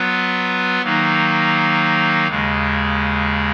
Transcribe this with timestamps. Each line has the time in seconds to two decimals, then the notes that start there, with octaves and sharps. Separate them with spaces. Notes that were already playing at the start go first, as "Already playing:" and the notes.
Already playing: F#3 B3 F4 B4
0.82 D#3 F#3 A#3 D#4
2.28 D#2 C#3 G#3